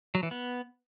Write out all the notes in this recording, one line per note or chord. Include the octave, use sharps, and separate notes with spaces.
F#3
E3
B3